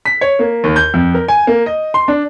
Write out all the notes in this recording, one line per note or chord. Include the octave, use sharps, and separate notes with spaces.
B6
C#5
A#3
D#2
G6
F2
A#4
G#5
A#3
D#5
C6
D4